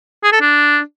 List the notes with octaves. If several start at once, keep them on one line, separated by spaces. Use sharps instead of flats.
G#4
A4
D4